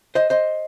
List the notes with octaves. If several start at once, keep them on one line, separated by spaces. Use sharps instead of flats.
C5 D#5
C5 D#5